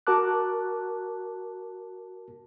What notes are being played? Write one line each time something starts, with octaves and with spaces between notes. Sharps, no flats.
F#4 A#4 A5 D6 F#6